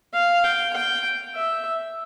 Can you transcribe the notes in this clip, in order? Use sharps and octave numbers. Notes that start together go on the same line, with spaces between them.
F5
G5
G5
E5